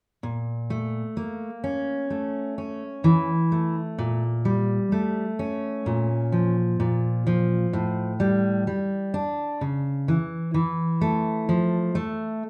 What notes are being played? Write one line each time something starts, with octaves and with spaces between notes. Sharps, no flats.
A#2
A3
A#3
C#4
A3
C#4
E3
A3
A#2
G3
A3
C#4
A#2
F3
A#2
F3
A2
G3
G3
D4
C#3
E3
E3
A3
F3
A3